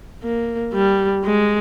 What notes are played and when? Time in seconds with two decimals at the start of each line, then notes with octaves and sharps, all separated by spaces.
0.23 A#3
0.73 G3
1.24 G#3